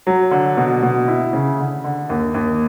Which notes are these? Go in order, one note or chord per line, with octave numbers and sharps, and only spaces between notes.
F#3
D3
B2
B2
E4
C#3
D3
D3
D#2
D#2